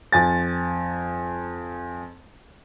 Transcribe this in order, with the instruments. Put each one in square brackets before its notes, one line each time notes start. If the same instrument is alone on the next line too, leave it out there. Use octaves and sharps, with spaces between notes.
[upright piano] F2 G#5 A6